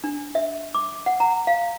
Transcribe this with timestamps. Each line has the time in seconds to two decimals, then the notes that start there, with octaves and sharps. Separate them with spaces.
0.04 D4
0.35 E5
0.75 D6
1.06 F#5
1.20 A#5
1.47 F5